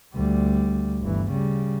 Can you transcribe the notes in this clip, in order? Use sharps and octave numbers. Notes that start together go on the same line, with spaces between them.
D2 G3
G1 E3
C#3 G3